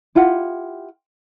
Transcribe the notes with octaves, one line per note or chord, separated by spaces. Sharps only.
E4 F4 G4 F#5